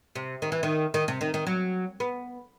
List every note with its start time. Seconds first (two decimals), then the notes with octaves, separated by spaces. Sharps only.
0.15 C3
0.42 D#3
0.52 E3
0.63 D#3
0.94 D#3
1.08 C3
1.21 D#3
1.34 D#3
1.47 F#3
2.00 B3